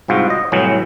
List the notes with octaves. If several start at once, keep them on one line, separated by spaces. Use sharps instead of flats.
C2 G#2 F4 F#4
D#5
C2 A2 E3 F#3